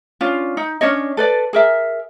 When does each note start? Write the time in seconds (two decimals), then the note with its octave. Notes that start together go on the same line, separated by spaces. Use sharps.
0.21 C#4 D4 F4
0.57 D#4
0.81 C#4 D4 C#5 D#5
1.17 A4 B4 D5
1.53 G#4 A#4 E5